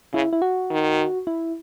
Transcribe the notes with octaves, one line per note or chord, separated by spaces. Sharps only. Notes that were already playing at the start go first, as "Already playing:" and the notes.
C#3 E4
E4
F#4
D#3
E4